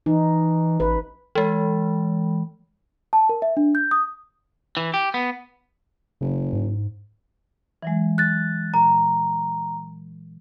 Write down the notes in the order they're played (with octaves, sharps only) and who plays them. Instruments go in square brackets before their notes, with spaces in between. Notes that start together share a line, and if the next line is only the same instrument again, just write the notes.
[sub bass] E3 [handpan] D#4
[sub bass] A1 [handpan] B4
[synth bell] E3 G#3
[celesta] A5
A#4
E5
D4
G6
D#6
[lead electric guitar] E3
G4
B3
[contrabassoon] F#1 [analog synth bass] C#3
[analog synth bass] G#2
[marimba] E3 F#3 G#3
[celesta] F#6 A6
[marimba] A#2 [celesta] A#5